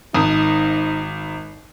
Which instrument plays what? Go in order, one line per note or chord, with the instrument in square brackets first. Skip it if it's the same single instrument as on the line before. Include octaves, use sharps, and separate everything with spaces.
[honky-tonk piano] G#1 D#6 [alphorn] D#4